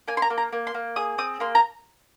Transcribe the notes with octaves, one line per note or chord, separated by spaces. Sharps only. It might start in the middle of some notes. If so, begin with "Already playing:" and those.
A#3 G#5
C6
A#5
A#3
A#5
A#3
C6
A#3
G#4 D#6
C4 D#6
A#3 C6
A#5